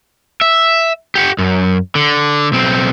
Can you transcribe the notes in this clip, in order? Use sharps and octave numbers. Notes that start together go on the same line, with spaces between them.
E5
G4 F#5
F#2
D3
B1 C4